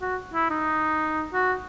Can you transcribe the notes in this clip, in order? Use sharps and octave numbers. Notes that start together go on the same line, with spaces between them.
F#4
E4
D#4
F#4